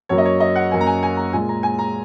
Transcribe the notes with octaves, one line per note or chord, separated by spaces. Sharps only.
F#2 F#3 A#3 C#5
D#5
C#5
D#5
F#5
F#2 F#3 A#3 G#5
A#5
G#5
G#5
A#5
A#2 G#3 G#5
A#5
G#5
A#5